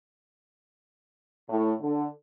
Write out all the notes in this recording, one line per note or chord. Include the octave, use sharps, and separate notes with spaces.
A2
D3